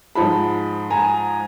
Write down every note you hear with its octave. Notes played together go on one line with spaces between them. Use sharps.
G#2 F3 G#3 A5 B5
G#5 A#5